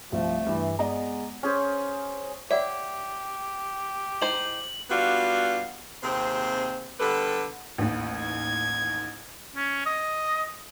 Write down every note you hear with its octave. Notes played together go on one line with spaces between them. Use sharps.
C2 F3 A3
G2 E3
G#3 B3 D5 D#5 A#5
C#4 G#4 C5
G4 C#5 D5 E5 F#5
G#3 D#4 E4 C5 F#7
G3 B3 D4 F4 F#4
D#2 C3 C4 G#4 C5
D3 G3 B3 G4 A4 B4
A1 D#2
G#6
C#4
D#5